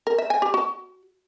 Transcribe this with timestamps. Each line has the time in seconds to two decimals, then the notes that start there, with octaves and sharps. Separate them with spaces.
0.07 A#4
0.18 E5
0.30 G#5
0.42 G4
0.54 F#4